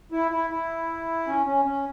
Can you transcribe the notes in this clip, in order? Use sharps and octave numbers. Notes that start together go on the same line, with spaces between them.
E4
E4
E4
C#4
C#4
C#4